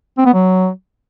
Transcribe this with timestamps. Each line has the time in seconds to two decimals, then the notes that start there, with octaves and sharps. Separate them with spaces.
0.18 C4
0.26 B3
0.34 F#3